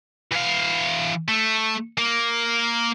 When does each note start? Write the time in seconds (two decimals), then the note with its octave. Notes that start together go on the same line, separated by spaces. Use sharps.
0.32 E3 F5
1.28 A3
1.98 A#3